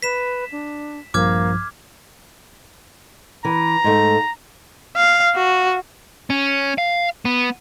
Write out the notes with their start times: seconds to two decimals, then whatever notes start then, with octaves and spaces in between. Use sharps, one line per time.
0.03 B4 B6 E7
0.52 D4
1.14 A#1 G2 F3 A#3 D6 F6 G#6
3.45 E3 A#5
3.84 G#2 A3
4.96 F5
5.35 F#4
6.30 C#4
6.78 F5
7.25 B3